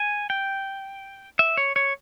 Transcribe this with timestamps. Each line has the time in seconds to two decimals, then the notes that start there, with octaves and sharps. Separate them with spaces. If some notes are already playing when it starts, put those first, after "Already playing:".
Already playing: G#5
0.30 G5
1.39 E5
1.57 C#5
1.76 C#5